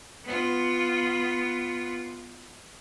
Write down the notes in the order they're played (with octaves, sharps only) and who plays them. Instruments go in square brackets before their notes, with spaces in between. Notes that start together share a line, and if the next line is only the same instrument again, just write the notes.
[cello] B3 F4